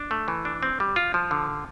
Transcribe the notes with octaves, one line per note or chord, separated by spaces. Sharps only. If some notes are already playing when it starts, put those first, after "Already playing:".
Already playing: D4
A3
E3
D4
C4
G3
F4
F3
D3